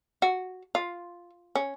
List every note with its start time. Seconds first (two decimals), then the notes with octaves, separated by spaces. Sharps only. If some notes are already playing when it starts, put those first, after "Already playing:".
0.22 F#4
0.75 F4
1.55 C#4